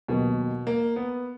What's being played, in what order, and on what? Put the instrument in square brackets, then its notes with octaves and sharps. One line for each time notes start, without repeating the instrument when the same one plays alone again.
[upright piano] D#2 D#3 F#3 B3 [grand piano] B2
[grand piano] A#3
B3